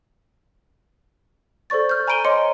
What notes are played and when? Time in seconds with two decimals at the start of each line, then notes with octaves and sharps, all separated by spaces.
1.70 A4 C5 D5 C#6 A6
1.89 F6 G6
2.07 G#5 A#5 B5 D7 D#7 G7
2.25 C#5 D#5 A#5 C6 D6 C#7